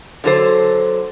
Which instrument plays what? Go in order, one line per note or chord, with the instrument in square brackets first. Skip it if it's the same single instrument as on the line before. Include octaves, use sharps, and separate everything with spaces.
[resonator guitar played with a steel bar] D3 F#3 A4 C5